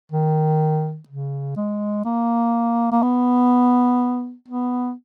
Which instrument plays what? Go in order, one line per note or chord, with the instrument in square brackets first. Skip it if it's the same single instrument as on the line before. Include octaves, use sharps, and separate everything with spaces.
[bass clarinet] D#3
C#3
G#3
A#3
A#3
B3
B3